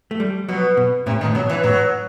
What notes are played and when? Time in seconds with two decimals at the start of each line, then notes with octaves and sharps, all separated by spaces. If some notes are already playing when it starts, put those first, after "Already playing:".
0.11 A3
0.20 G3
0.48 B2 F#3
0.77 B2
1.06 A2 C3
1.21 D#3
1.24 A2
1.35 B2 F#3
1.50 E3
1.64 A2 F#3